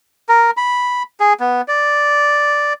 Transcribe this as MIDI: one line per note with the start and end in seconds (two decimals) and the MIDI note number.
0.29 0.51 70
0.57 1.03 83
1.20 1.33 68
1.40 1.61 59
1.68 2.73 74